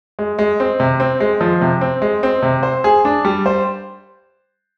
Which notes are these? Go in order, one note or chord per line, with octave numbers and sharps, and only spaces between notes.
G#3
G#3
C4
C3
C4
G#3
F3
C3
C4
G#3
C4
C3
C5
G#4
D4
G3
C5